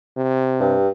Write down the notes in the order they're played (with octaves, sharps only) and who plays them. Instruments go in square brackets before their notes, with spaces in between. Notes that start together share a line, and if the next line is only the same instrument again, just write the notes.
[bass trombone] C3
[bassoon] G2